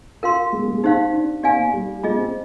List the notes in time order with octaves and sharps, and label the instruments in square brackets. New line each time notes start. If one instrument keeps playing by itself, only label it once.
[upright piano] F4 [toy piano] A#4 F5 C6
[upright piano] G#3
G#3
[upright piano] C4 [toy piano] D#4 G4 C5 F5
[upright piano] D4
[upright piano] C4 [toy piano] G4 D5 F5 G#5
[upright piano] A#3
G3
[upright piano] G#3 [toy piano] F4 G#4 D#5
[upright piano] C4